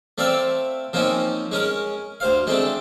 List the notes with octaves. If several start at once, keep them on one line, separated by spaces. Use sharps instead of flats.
A3 C4 D5 E5 F5
F3 A#3 C4 C#4 D#4
G#3 C#4 A#4
D2 C5 F5
G#3 A3 C4 D4